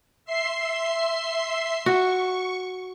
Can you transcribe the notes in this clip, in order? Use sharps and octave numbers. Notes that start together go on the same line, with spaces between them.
E5 C6 C7
F#4 C#6